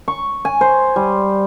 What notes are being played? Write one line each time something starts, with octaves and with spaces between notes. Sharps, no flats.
C#6
G#5
C5
G3